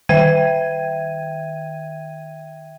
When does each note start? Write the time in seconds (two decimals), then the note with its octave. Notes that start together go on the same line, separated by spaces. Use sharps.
0.09 D#3 E5 G5 G#6 D#7